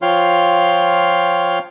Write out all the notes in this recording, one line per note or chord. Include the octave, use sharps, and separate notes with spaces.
F3 F4 C#5 F5 G5 C6